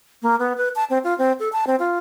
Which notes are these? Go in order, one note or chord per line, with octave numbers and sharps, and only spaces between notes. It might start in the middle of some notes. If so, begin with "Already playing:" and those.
A#3
B3
B4
A5
C4
F4
C4
A4
A5
C4
F4